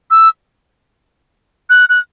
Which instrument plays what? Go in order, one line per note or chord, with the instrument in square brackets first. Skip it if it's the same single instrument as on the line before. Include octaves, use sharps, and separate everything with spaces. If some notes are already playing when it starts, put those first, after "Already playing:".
[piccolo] E6
F#6
F#6